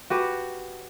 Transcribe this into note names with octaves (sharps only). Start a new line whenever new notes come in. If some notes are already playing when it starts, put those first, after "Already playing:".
F#4 G4 B4